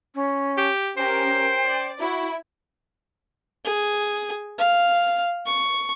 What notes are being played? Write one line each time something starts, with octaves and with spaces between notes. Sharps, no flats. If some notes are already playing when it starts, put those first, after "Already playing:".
C#4
G4
C#4 G4 A#4 C5 G5
D5
E4 F#4
G#4
F5
C#6